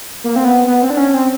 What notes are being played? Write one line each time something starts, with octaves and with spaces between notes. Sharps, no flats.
A#3
C4
B3
B3
C4
D4
C#4
C4